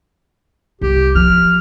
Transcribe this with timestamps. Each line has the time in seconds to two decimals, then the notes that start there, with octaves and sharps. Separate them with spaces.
0.81 C2 G4
1.15 F3 F6